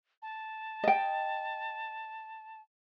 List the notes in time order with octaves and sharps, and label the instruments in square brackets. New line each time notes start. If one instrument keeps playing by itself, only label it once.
[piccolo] A5
[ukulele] D#5 G5